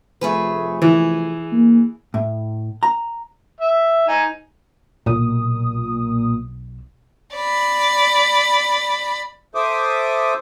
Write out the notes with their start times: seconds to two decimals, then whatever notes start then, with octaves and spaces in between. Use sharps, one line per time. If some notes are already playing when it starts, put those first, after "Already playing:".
0.21 F1 A3 G#4 B4
0.82 E3 G#4
1.52 A#3
2.14 A2
2.83 A#5
3.61 E5
4.08 D#4 G#5
5.06 B1 A#2 D#6
7.35 D5 B5
9.55 A4 C5 E5 D6 D#6